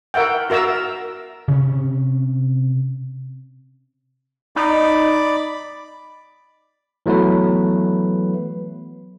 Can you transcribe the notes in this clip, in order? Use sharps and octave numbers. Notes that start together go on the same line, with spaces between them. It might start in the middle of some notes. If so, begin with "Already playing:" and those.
A#4 E5 F#5 G5
F#4 A#4 E5 A#5 E6
C3 C#4
D#4 D5 B5 D6
E3 F#3 A3 B3 B4